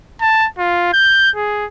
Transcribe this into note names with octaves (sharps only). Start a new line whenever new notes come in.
A5
F4
G6
G#4